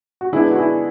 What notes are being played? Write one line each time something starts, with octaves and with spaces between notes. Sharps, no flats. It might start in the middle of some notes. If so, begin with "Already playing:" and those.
F#4
D3 G#3 B3 D4 E4 G#4
F#4
E4 G#4